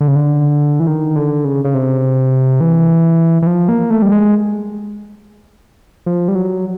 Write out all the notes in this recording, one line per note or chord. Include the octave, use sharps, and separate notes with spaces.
D3
C#3
D3
E3
D#3
D3
C#3
C#3
C3
E3
E3
F3
A#3
A3
G3
G#3
F3
G3
F#3